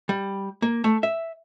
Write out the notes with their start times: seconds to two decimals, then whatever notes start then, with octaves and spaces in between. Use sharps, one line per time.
0.09 G3
0.62 A#3
0.84 A3
1.03 E5